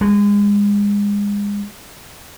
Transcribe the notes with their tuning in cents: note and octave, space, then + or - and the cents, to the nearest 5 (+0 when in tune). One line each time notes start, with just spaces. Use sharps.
G#3 -30